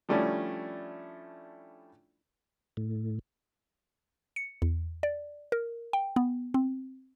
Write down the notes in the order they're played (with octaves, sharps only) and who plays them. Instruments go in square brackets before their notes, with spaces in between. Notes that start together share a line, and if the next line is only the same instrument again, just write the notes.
[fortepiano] F3 G3 A3 C#4 D4 E4
[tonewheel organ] A2
[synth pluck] C#7
E2
D5
A#4
G5
B3
C4